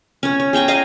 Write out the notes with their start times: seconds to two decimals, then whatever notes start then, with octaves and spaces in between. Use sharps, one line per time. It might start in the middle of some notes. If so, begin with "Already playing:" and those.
0.23 C#4 C#5
0.40 C#5
0.53 G#4 G5 A#5 C#6
0.68 D#5 F5 A#5